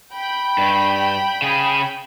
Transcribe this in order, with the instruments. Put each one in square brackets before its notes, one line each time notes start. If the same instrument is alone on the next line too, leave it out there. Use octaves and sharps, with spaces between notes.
[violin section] G5 B5
[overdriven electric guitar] G2
C#3 G#4